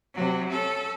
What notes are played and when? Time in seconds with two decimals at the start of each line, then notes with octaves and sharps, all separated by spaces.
0.14 C3 F#3
0.49 C#4 A4